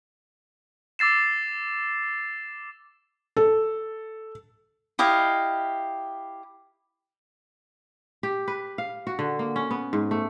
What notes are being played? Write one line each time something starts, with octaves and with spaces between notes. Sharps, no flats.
D6 E6 A6 C7 E7
A4
E4 G4 D#5 F5
G4
B4
F5
F#4
D3
A#3
C#4
B3
G#2
A3